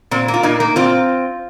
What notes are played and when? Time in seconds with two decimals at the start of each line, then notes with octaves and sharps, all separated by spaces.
0.11 A#2 C4
0.28 A#3
0.34 F4
0.43 A#2 A#3 D#4
0.60 A#3
0.76 A#2 C4 F4